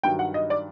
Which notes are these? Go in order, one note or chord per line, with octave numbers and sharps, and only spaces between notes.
G2 D#3 F#3 G5
F#5
D#5
D5